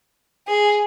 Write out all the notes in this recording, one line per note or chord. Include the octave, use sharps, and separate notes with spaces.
G#4